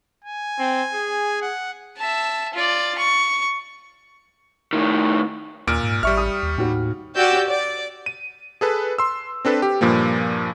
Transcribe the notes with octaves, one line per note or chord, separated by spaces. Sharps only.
G#5
C4
G#4
F#5
E5 A5
F4 D5
C#6
A2 D#3
D#2 A#2 F6 D7
G#2
A1 G3 E5 C#6 F6
D#6
D#2
D#2 A2 F#4
F#4 G4 D5 E6 G6
D5
D#7
G#4 A4 B4
C6 E6
C4 D4 A4 B4
G4
G2 A#2 F3 A#3